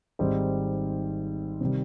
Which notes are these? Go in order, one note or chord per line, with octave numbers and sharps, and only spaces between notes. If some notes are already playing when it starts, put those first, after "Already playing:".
G#1 G#2 G3 C4 D#4
C3 D#3 G3